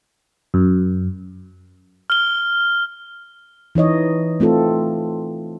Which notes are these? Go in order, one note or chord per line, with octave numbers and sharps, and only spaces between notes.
F#2
F6 G7
E3 D#4 C#5 D#5
A3 C4 F4 A4